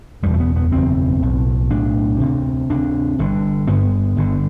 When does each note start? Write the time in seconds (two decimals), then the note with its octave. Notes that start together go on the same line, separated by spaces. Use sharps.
0.23 F#1 E2 B2 G3
0.34 A3
0.40 B3
0.56 B3
0.72 F#1 E2 B2 C4
1.22 B1 A2
1.71 B1 A2 D4
2.20 D2 C3
2.70 D2 C3 D4
3.19 G1 G2 D3
3.67 G1 G2 D3 B3
4.16 G1 G2 D3